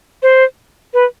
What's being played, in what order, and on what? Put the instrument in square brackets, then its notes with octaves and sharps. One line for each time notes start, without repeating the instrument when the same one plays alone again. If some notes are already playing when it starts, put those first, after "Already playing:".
[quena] C5
B4